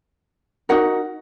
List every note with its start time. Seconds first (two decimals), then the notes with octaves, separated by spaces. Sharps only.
0.69 D#4 F#4 A#4 F#5